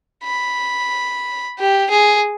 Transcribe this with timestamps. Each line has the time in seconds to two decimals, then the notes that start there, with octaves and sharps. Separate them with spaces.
0.24 B5
1.59 G4
1.91 G#4